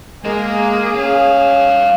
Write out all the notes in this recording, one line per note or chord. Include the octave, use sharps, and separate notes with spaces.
G#3 A#3 G#4 A#4
G2 C#4 F5